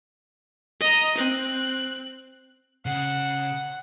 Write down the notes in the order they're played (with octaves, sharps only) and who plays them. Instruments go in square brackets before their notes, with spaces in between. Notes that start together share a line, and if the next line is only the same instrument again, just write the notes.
[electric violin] D#5 A#5
C4 F#6
[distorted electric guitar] C#3 [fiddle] F#5